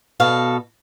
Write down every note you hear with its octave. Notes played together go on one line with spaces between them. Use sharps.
B2 A4 F5